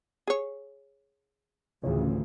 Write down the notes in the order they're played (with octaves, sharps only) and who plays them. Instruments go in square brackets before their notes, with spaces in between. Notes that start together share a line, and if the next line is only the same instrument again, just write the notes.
[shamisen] G#4 C#5
[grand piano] A1 F3 [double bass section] D2 [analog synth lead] C#3